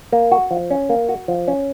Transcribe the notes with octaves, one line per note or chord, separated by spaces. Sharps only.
A#3
F#4
F3
C#4
A#3
F#4
F3
C#4